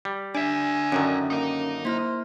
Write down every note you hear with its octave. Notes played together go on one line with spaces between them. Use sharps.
G3
D4 D5 E5 G#5
F#2 D3 D#3 C#4
A#3 D#4 D#5
A#3 E4 C5 F6